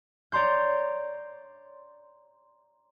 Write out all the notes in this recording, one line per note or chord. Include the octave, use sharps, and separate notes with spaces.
C#5 D5 A#5 C6 G6